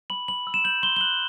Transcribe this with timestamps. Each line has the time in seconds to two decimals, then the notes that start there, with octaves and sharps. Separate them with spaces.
0.10 B5 F#7
0.28 B5 F#7
0.47 E6
0.54 E7
0.64 G6 F#7
0.82 C6 G7
0.96 G7
1.01 F#6 F#7